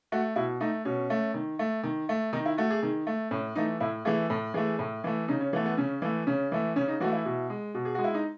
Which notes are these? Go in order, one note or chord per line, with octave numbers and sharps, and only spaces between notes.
A3 F#4
B2 E4
A3 D#4
B2 C#4
A3
D#3
A3
D#3
A3
D#3 D#4
E4
A3 F#4
G#4
D#3
A3
A2 C#4
E3 A3 D#4
A2 E4
E3 A3 G#4
A2 A4
E3 A3 G#4
A2
E3 A3
C#3 D#4
C#4
E3 A3 B3
B3
C#3 C#4
E3 A3
C#3 C#4
E3 A3
C#3 C#4
D#4
E3 A3 F#4
E4
B2
G#3
B2
G#4
G#3 F#4
E4
D#4